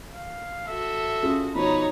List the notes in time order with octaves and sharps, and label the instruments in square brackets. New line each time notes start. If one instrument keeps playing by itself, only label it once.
[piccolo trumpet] F5
[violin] F#4 [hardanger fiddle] A4 [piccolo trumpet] E5
[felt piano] C#4 F4 G#4
[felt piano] B2 F3 [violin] D#4 C#5 [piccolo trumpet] B5